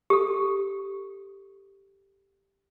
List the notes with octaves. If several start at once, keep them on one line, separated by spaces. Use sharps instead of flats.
G4 A4